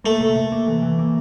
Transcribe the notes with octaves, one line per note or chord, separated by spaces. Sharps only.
A3 A#3
C3
C3
A#3
E3
E3
A#3